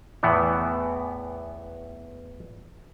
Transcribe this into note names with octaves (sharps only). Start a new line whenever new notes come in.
E2 A2 E3 B3